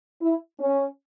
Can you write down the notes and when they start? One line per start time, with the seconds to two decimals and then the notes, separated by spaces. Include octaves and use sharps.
0.21 E4
0.60 C#4